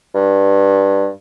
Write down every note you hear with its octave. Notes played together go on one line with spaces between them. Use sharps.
G2